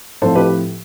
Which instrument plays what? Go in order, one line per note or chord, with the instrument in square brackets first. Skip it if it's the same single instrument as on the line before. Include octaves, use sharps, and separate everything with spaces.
[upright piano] A2 F3 C4 A4 C5
G4 B4